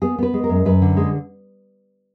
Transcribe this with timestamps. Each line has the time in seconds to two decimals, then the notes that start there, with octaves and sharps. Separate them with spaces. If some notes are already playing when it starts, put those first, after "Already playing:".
0.02 B3 G#4
0.18 B3 B4
0.34 G#3
0.44 A#4
0.49 F#2
0.65 F#2 B4
0.82 D3
0.97 G#3